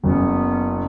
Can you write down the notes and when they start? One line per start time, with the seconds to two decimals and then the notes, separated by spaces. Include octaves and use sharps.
0.04 F#1 B3 C#4